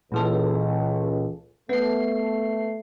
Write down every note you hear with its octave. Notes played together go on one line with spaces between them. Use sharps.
C#2 A#2 E3 A4
A3 B3 C7